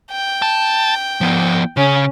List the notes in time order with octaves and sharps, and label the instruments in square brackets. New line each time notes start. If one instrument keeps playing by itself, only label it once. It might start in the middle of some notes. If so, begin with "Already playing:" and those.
[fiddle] G5
[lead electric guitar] A5
F3 B3
[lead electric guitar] C#3 [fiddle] C#4